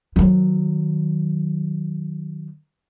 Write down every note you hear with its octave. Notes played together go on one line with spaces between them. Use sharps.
D#3 F#3